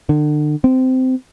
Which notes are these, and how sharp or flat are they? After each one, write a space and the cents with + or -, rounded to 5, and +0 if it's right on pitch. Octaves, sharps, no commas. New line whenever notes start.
D3 +35
C4 -20